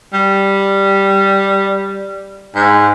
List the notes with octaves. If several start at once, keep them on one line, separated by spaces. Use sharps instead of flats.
G3
G#2